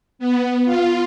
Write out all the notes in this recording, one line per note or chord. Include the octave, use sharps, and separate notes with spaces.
B3
F4